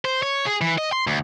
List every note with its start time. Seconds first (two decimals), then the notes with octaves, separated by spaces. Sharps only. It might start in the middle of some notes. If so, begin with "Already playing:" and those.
0.05 C5
0.23 C#5
0.46 G#4
0.61 E3
0.78 D#5
0.92 C6
1.07 D2